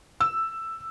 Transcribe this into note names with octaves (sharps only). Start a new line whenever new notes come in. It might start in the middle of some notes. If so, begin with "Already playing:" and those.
E6